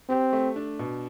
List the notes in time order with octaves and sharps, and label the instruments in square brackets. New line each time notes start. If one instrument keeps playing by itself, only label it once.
[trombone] C4 [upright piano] G4
[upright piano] A3
D4
B2